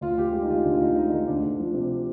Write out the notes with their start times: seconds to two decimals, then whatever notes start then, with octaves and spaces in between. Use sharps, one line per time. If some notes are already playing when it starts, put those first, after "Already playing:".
0.01 D2 F4
0.17 D2 G4
0.33 G#3 G4
0.42 D#4
0.49 D3 F4
0.64 D2 D4
0.74 F4
0.80 D2 D#4
0.96 G#3 D#4
1.12 D3 D#4
1.27 D2 D4
1.44 D2
1.60 F3
1.74 C3